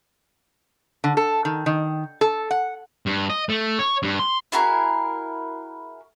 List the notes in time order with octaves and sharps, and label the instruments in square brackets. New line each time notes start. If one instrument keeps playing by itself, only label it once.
[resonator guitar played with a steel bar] D3
A4
D#3
D#3
A4
F#5
[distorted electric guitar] G2
D#5
A3
C#5
G2
C6
[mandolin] E4 F#4 G#4 A#4